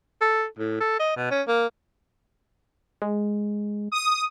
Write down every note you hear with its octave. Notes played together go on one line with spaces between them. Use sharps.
A4
A2
A4
D#5
B2
C#4
A#3
G#3
D#6